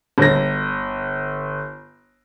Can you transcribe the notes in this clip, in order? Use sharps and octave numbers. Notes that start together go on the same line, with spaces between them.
G1 A#6